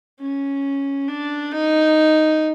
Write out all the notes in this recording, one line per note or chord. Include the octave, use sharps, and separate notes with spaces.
C#4
D4
D#4